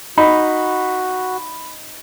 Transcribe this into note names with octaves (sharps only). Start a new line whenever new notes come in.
D#4 F#4 B5